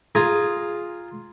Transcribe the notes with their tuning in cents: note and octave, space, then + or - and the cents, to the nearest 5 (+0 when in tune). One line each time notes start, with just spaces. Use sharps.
F4 +0 G#4 +0 A#5 +0